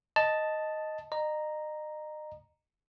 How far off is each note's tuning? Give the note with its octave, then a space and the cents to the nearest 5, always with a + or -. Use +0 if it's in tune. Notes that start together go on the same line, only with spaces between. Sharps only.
D#5 +0 A5 +0
D#5 -35 A#5 +0